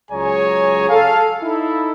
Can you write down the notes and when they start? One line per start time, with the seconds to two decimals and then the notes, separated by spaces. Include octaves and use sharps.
0.11 C#2 F#3 G#4 C#5 G#5 A#5
0.90 A4 F5
1.41 D#4 E4 A4